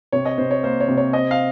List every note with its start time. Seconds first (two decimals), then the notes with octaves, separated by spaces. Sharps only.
0.12 C3 C#5
0.25 D#5
0.38 C3 C5
0.51 C#5
0.63 A#3 C5
0.80 C#5
0.89 C3
0.97 C#5
1.13 C4 D#5
1.31 F5